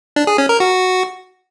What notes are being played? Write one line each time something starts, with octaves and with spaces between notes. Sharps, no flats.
D4
G#4
C#4
A#4
F#4